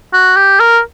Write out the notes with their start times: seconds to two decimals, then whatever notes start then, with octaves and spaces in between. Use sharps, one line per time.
0.13 F#4
0.36 G4
0.60 A#4